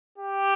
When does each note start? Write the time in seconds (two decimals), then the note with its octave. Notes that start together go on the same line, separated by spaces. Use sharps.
0.18 G4